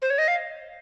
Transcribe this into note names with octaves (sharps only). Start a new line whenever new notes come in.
C5
C#5
D#5
F5